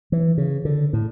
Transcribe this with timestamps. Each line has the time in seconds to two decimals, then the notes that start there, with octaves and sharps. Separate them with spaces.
0.12 E3
0.38 C#3
0.65 D3
0.93 A2